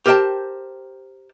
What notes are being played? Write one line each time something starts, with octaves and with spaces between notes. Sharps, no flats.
G4 A#4 C5 D#5 G5 A5